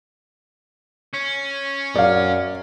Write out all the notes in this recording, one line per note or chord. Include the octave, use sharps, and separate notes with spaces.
C#4
F#2 D5 F5